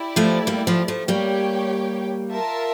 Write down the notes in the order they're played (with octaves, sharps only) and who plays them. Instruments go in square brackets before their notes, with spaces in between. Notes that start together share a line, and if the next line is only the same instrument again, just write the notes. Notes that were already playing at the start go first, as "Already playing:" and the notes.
Already playing: [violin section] E4 G4 D5
[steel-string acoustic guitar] F3 A3
G3 A#3
F3 A3
F3 A3
[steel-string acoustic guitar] G3 A#3 [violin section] G4 C#5 G5
[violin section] F4 A#4 E5 A5